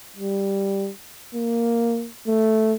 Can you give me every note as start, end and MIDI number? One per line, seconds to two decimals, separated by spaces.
0.16 0.90 55
1.35 2.08 58
2.28 2.74 57